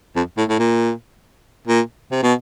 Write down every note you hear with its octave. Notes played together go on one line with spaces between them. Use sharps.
F2
A2
A2
A#2
A#2
C3
B2